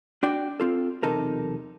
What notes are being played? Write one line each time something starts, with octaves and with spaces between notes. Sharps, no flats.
D4 F#4 D5 G5
C4 F4 A4
B1 E2 C3 D#4 A4 A#4